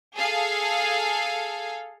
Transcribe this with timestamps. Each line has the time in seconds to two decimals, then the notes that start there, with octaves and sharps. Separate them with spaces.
0.16 G#4 A4 F5